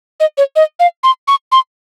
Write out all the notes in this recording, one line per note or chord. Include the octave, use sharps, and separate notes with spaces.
D#5
C#5
D#5
F5
C6
C#6
C6